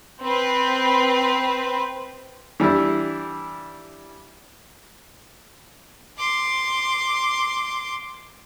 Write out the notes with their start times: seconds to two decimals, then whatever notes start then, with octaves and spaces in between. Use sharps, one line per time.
0.22 C4 B4
2.60 E3 G3 D4 E4
6.18 C6 D6